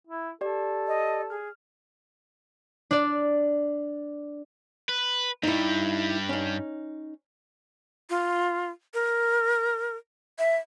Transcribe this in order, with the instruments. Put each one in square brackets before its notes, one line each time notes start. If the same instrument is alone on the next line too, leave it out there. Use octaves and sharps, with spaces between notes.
[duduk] E4
[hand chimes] G4 D5 [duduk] A4
[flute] D#5
[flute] G#4 [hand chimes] F6
[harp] D4 D5
[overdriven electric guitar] B4
[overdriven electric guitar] G2 G3 [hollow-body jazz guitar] D#4 E4
[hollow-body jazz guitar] C#4 D#4
[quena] F4
A#4
E5